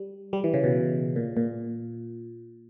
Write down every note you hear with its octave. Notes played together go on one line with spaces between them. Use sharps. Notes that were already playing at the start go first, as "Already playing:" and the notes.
Already playing: G3
G3
E3
C#3
B2
A#2
A#2